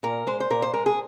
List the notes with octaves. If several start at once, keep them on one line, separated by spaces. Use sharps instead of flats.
A#2 A#4
G#3 C5
C5
A#2 A#4
C5
G#3 A#4
G#4